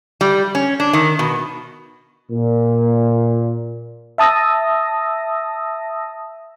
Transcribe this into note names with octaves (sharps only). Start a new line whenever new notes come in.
G3
C#4
D4
D#3
B2
A#2
E5 A5 D#6 E6 A#6